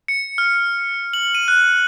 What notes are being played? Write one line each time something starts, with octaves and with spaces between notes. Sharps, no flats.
C#7
F6
F#7
D#7
F#6